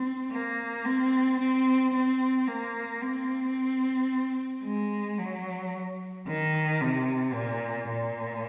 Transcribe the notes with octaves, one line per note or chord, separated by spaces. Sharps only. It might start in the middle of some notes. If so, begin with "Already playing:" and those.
Already playing: C4
A#3
C4
C4
C4
A#3
C4
G#3
F#3
D#3
C3
A#2
A#2